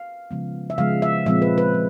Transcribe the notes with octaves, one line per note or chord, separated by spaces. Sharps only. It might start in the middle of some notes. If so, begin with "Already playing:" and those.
Already playing: F5
C#3 F3 G#3 B3
E5
C#3 F3 G#3 B3 F5
E5
A#2 F3 G#3 C4 E5
B4
B4
F3